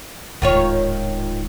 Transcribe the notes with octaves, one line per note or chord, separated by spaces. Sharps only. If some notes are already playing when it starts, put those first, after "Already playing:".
D1 G#2 D#3 F4 C#5